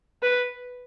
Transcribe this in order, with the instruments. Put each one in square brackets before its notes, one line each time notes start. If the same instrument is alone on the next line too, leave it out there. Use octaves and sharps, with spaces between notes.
[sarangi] B4